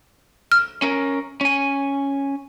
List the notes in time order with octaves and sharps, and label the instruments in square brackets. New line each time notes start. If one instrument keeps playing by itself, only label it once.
[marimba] F6
[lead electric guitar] C#4 A#4
C#4 G#5